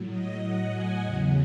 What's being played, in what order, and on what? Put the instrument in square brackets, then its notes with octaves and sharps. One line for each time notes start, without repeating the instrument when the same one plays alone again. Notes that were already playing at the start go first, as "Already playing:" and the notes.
Already playing: [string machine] A2 F#3
D#5
F#5
G#5
E2 C#3 F#3 F#5